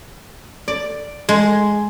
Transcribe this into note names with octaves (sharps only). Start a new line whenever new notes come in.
D5
G#3